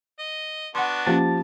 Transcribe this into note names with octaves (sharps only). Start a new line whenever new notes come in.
D#5
B3 D4 F#4 F#5 C6
F3 A#3 C#4 G4 A5